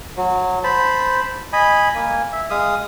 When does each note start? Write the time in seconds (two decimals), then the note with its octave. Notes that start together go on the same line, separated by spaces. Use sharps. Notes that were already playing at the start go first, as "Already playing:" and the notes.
0.17 F#3
0.64 C5 A5 B5
1.53 D#5 G#5 B5
1.95 A#3 G#5
2.32 E5
2.50 G#3 F5 D#6